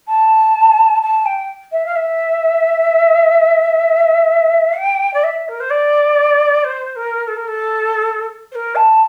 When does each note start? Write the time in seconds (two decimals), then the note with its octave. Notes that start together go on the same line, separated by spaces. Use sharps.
0.08 A5
1.02 A5
1.25 G5
1.72 E5
1.86 F5
1.95 E5
4.77 G5
5.13 D5
5.23 E5
5.48 A#4
5.60 C5
5.70 D5
6.64 C5
6.96 A#4
7.27 A4
7.36 A#4
7.47 A4
8.52 C5
8.55 A#4
8.75 A5